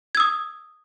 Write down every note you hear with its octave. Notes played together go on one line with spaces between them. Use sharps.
D#6 E6 G#6